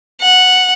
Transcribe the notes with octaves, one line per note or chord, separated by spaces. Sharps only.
F#5